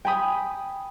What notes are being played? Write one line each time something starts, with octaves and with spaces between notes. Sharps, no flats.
G5 G#5 B5 D#6